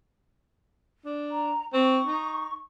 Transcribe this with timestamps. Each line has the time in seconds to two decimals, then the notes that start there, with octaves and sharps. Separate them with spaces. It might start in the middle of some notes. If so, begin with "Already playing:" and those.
1.05 D4
1.31 A#5
1.73 C4 C#6
2.05 D#4